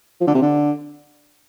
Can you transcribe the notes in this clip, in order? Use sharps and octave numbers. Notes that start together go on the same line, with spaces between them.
F3
D3
C3
D3